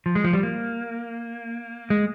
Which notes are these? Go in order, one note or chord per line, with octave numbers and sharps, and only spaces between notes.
F3
G#3
F3
G3
A#3
G#3